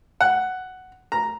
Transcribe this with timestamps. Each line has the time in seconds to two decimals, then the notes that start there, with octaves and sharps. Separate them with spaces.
0.21 F#5
1.12 A#5